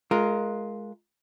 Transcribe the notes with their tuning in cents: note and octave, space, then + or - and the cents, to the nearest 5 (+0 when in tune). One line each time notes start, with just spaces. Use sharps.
G#3 +20 F4 +0 A#4 +0